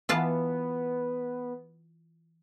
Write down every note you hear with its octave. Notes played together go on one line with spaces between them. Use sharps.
E3 B3 F4 A5